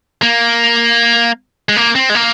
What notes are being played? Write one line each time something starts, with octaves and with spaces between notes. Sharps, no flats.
A#3
G#3
A#3
C4
G#3
A#3